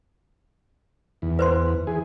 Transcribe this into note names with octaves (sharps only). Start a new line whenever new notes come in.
E2
B4 C5 C6
E3 G#4